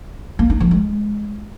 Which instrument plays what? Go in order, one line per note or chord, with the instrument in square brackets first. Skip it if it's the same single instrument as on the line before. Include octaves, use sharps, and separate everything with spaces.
[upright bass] A#3
D#4
F3
G#3